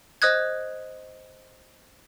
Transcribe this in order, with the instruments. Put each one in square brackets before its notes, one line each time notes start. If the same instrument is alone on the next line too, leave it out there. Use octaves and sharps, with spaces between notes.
[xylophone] C5 D#5 D#6 F#6 G#6